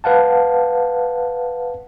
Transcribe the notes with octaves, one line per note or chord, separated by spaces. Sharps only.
B4 F5 F#5 A5